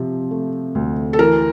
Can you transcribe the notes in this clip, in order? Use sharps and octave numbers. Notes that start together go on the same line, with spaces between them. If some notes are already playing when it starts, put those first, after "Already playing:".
Already playing: C3 F3
A3
D2
A4
E3 A#4